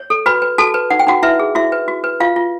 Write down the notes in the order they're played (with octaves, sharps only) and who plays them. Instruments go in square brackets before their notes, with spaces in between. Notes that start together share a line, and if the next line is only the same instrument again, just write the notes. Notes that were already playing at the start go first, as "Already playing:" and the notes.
Already playing: [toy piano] C#5
A4
F#4 B4 B5
B4
F#4 A4 A5
B4
D#4 F#5
G5
D#4 F#4 F#5
E4 B4 E5
G#4
E4 F#4 E5
B4
F#4
B4
F4 F5
F4